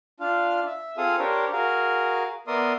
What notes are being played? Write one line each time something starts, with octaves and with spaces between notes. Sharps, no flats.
D4 F4 F5
E5
C4 F4 G#4 A4 F5 D#6
D4 G4 A#4 C5 C#5
F#4 G#4 A#4 F5
B3 A#4 D5 E5 C6 D#6